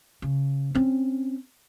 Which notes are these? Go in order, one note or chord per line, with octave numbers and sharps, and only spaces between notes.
C#3
C4 C#4